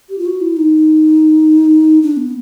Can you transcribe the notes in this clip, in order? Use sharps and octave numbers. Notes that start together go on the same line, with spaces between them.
G4
F4
F#4
E4
D#4
D4
B3